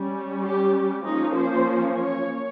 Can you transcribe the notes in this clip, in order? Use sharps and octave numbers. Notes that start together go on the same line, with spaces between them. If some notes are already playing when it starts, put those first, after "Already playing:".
Already playing: G3 C#4
G4
F3 A#3 C#4 D#4
C5
C#5